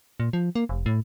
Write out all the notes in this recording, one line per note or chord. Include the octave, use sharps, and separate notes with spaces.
A#2
F3
A#3
F1
A2